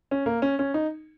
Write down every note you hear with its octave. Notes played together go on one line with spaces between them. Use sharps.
C#4
A#3
C#4
C#4
D#4